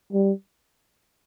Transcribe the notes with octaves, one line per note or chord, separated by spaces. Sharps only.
G3